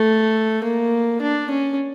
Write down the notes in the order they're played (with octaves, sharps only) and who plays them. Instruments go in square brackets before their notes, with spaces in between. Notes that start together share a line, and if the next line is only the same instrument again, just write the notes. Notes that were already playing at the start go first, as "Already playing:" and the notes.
Already playing: [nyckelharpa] A3
A#3
D4
C#4